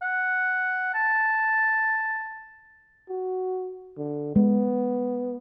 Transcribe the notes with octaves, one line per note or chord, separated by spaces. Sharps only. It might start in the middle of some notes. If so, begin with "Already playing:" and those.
F#5
A5
F#4
D3
G#3 B3